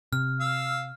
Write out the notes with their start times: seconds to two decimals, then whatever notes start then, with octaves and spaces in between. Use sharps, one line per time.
0.13 C3 F6
0.40 F5 E6